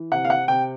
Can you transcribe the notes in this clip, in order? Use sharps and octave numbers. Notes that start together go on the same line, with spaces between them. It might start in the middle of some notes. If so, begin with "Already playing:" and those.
Already playing: E3
C3 F#5
F5
F#5
C3 G5